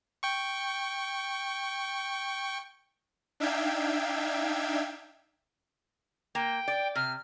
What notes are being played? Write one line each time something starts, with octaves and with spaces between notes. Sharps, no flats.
G5 C#6
D4 D#4 E5 F5 G5 G#6
A#3 G5
D5
C3 F6